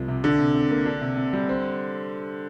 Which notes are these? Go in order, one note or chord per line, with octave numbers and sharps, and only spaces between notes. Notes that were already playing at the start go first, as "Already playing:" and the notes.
Already playing: C2 F3
C3
D3 D4
C3
C3
A#3
D4
C3
C3
G3
C4